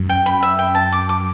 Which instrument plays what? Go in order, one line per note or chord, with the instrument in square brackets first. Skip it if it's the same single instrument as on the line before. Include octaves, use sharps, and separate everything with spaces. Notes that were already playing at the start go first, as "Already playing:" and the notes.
Already playing: [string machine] F#2
[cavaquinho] G5
B5
E5
G5
A5
D6
D6